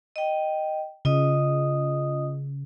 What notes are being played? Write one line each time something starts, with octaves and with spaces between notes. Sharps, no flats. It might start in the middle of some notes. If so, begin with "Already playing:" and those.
D#5 G5
C#3 F4 D#5 D#6